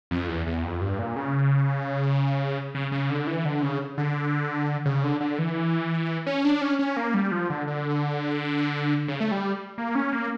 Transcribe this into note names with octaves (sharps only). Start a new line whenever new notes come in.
F2
E2
E2
F2
G2
A#2
C#3
C#3
C#3
D3
E3
D3
C#3
D3
C#3
D3
D3
E3
C#4
D4
C#4
C#4
A#3
G3
F3
D3
D3
C#3
A3
G3
A#3
C#4
A#3